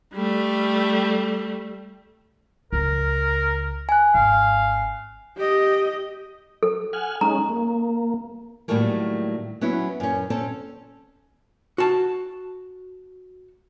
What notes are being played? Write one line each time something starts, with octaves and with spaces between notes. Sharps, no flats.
G3 A3
C#2 A#4
G#5 F#6
G#1 F5
G4 D#5
A4
F#5 G#5 F6
G#3 C#4 D#4 A#5
A#3
A2 D#3 F#3 G3 A3 A#3
F#3 B3 C#4 E4
F#2 C#4
C4 C#4 A4
F#4 A5